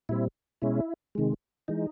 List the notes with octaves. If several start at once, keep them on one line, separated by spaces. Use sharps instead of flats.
A#2 G3 C4 E4
B2 G#3 C#4 E4
C3 D#3 G#3
E3 G#3 D#4